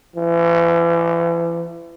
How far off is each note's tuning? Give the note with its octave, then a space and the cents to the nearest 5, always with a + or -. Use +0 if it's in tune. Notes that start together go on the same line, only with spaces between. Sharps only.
E3 +40